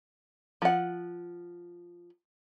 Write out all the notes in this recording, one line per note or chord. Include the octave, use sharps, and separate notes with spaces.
F3 F#5